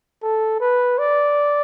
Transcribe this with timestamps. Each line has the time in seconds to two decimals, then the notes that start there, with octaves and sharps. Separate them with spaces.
0.23 A4
0.60 B4
0.98 D5